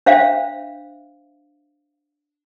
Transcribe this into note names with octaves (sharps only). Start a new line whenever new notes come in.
D4 C5 E5 F5